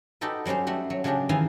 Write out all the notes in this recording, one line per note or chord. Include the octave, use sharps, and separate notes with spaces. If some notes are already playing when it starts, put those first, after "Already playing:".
D#4 F#4 G4 A4 B4
F#3 G3 C#4 G4 C5
A3 F#4 G4
F#3
C#3 F#3 G#3 D4 G4
D#3 E3 D#4 E4 F5 G#5